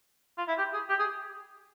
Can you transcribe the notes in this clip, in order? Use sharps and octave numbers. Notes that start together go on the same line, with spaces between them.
F4
E4
G4
G#4
G4
G#4